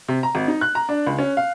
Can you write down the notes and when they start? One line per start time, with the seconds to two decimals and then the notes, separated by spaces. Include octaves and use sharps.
0.08 C3
0.23 A#5
0.35 G#1
0.48 D#4
0.61 F#6
0.75 A#5
0.89 D4
1.06 C#2
1.19 C#4
1.37 F5